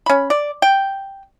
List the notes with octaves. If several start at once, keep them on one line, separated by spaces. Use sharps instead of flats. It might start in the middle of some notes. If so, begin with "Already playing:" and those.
C#4 B5
D5
G5